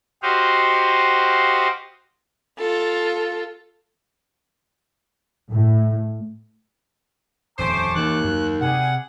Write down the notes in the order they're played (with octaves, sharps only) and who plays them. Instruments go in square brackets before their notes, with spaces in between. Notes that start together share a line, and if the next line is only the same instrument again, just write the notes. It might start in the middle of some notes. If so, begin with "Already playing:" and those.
[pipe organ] F#4 G4 C5 D#5 F5
[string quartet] F4 A4
[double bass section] A2
[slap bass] D#1 F2 [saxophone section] A3 C#4 C5 [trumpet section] A5 C#6 D6
[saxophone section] D#2 [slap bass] E3 A#3 [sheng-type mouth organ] F#6
[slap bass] F#2 F#3
[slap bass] C3 [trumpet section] G3 G#4 [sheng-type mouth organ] F#5